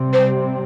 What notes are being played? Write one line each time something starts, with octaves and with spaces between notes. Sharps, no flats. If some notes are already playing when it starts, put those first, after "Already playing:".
Already playing: C3 G3 C4
C5